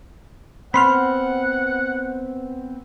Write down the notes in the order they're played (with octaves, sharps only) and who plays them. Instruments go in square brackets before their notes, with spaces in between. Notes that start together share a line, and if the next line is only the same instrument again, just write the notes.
[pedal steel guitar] B3 C4 [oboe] F#5 [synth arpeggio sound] B5 C6 F6